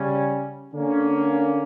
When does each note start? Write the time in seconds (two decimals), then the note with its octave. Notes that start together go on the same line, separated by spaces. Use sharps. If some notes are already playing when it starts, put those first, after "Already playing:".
Already playing: C#3 G3 C#4
0.73 D3 A#3 C#4